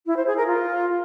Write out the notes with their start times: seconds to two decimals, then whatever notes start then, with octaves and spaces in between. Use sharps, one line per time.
0.06 E4
0.16 C5
0.26 G#4
0.36 A#4
0.46 F4